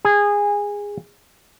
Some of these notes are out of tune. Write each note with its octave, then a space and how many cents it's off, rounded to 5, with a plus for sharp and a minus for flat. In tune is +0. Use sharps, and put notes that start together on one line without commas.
G#4 -20